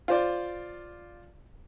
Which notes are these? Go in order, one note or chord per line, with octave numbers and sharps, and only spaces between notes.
F4 C5 D5